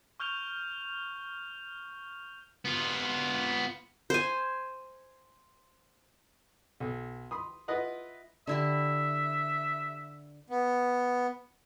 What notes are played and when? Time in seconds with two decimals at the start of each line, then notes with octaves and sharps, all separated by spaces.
0.20 C#6 F6 G6 F7 G7
2.65 B3 F4
4.10 C5 G#5
6.80 B1
7.31 B5 C6 D#6
7.68 E4 F4 B4 D#5 F#5
8.47 D3 E4 G4 E5
10.50 B3